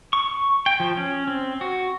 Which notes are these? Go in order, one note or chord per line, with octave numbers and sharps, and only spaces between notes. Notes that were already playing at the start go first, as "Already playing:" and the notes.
C#6
G5
F3
C#4
C4
F#4